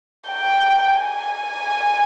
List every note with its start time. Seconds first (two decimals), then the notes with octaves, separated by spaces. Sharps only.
0.29 G5
0.95 G#5